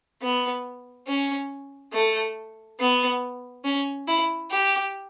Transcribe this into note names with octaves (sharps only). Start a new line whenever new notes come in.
B3
C#4
A3
B3
C#4
E4
G4